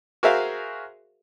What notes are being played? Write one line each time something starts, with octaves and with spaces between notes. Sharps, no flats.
F#4 G#4 A#4 C5 E5 F5